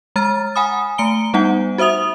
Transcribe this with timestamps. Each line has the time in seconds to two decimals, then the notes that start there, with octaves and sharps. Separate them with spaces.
0.16 G#3 A#5 F6 A6
0.56 F#5 G#5 B5 D#6
0.98 A3 A#5 C#7 D7 G7
1.34 G3 B3 D#4 F#5
1.78 F#4 C5 E5 D#6 F7